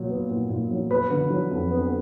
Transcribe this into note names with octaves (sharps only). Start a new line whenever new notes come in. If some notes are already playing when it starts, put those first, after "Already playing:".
Already playing: A#2 F#3
B3
A#2
A#2
F#3
B3 B4
D3
F#3
F2
B3